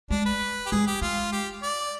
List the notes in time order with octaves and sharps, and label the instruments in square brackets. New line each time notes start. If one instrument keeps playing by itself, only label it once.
[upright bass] G#3 [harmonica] D4
[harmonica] B4
G4
[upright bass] G#3 [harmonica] G#4
[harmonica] G4
[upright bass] G#3 [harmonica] F4
[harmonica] G4
D5